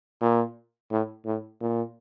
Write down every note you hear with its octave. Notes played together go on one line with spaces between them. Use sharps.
A#2
A2
A2
A#2